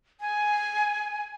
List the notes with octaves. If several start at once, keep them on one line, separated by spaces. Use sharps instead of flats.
G#5